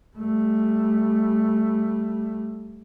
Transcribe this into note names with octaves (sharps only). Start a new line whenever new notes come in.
G3 A3